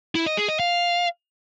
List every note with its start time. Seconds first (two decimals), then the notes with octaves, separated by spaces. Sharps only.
0.15 E4
0.26 D#5
0.37 G#4
0.48 D#5
0.59 F5